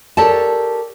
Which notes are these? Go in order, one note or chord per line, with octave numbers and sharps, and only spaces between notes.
G4 A4 A#4 C#5 D5 A5